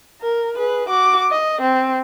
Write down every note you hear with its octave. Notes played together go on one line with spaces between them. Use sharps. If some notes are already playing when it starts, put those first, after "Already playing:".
A#4
G#4 B4
F#4 D6
D#5
C4